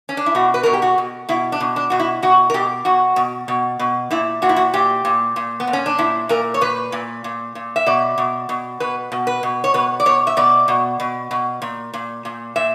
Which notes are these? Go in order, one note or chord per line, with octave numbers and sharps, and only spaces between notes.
C#4
D4
E4
B2 F#4
B4
B2 A#4
G4
F#4
B2
B2 E4
D4
B2
D4
B2 F#4
E4
B2 F#4
A#4
B2 G4
B2 F#4
B2
B2
B2
A#2 E4
A#2 F#4
E4
F#4
A#2 G4
A#2
A#2
B3
A#2
C#4
D4
A#2 E4
A#2 A#4
C#5
A#2 B4
A#2
A#2
A#2
E5
B2 D5
B2
B2
B2 B4
B2
B4
B2
C#5
B2 B4
D5
B2 C#5
E5
B2 D5
B2
B2
B2
A#2
A#2
A#2
A#2 E5